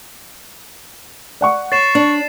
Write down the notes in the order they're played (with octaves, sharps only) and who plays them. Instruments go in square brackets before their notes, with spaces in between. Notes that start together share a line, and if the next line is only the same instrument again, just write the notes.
[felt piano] D5 F#5 C#6
[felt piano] C#5 [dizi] C#6 [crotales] A6 C7 E7
[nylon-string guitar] D4